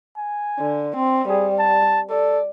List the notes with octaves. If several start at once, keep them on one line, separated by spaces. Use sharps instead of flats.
G#5
D3
C4
G3 G#4
A5
A4 D5